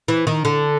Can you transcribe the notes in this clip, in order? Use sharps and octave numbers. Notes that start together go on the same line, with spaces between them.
E3
D#3
D3